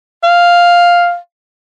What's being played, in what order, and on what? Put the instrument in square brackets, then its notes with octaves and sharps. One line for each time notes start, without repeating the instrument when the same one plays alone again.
[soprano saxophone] F5